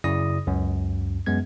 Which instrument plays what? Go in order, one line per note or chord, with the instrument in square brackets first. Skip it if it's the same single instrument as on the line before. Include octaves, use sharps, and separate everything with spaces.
[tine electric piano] F#2 C#3 E4 D5 D#6 A#6
C#2 F#2
F#2 G#3 B3 G#6